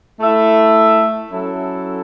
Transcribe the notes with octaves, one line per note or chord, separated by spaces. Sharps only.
A3 E4 A4 E5
F#3 C#4 E4 A4